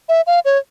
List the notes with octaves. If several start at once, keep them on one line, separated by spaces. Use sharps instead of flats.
E5
F5
C#5